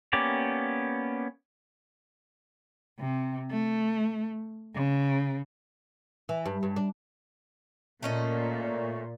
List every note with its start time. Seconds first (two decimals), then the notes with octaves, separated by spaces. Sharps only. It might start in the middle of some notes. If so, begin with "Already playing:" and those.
0.13 A#3 B3 C#4 G4 D5
3.00 C3
3.51 A3
4.75 C#3
6.29 E3
6.46 G2
6.63 G2
6.76 D4
8.03 A#2 A3 C#4 D#5